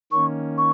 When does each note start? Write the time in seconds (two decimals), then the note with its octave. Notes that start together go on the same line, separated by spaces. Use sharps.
0.12 D#3 A#3 C#4 C#6
0.58 C#6